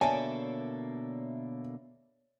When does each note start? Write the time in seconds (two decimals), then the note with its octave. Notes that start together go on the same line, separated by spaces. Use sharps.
0.01 B2 D3 A#3 C#5 D5 E5 G#5 A5